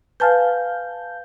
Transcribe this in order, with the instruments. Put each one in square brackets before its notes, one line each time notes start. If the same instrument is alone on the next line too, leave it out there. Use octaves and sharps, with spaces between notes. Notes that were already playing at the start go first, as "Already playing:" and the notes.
[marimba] B4 G#5 F6 [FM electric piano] F5 A5 G6